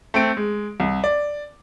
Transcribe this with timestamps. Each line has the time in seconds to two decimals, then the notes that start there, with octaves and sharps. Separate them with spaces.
0.14 A3 C4 D7
0.37 G#3
0.80 C2
1.04 D5